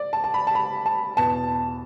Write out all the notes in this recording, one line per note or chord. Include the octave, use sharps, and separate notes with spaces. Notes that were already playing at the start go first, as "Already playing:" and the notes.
Already playing: D5
A5
A5
B5
A5
B5
A5
E2 B2 B3 A5